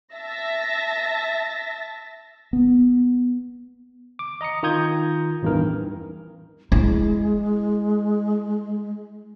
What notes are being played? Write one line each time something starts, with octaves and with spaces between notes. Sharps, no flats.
E5 A5 A6 A#6
B3
D6
D#5 A#5 D#6 C#7
D#3 F4 A#5 D#6 G6 G#6
A1 E2 G2 D#3 E3 A#4
G#3 E4